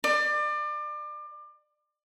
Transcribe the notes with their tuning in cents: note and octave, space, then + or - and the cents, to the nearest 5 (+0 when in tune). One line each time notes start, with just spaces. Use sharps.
D5 +30